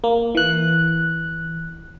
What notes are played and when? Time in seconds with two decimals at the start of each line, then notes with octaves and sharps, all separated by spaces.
0.04 A#3
0.35 E3 F#6